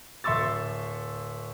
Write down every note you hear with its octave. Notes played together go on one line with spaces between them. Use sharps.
D1 E5 C6 C#6 E6 A6